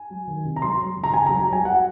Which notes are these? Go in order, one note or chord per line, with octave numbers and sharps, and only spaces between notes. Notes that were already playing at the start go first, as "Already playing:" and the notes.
Already playing: G#5
F#3
D#3
C3
A#5
F#3 C6
F#3
C#3
A#5
C#3 G#5
F#3 A#5
A#5
F#3 G#5
F#3 F#5